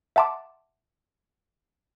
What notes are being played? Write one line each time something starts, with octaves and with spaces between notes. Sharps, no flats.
E5 F#5 A5 C6 D6